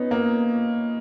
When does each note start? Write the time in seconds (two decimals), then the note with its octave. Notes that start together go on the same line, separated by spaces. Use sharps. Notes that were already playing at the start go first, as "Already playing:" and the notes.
Already playing: B3 C#4 D#4
0.11 A#3